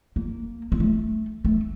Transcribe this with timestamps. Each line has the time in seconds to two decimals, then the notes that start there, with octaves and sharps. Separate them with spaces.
0.16 A#3
0.72 A#3
0.80 A3
1.45 A3